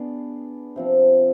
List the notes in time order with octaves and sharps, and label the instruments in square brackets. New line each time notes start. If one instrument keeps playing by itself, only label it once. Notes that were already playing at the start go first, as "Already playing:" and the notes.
Already playing: [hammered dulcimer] B3 D4 G#4
C3 F3 C4